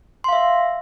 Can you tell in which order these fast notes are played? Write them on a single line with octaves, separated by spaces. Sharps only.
C6 F5 E5